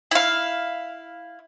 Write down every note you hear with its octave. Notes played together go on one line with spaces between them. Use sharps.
E4 F5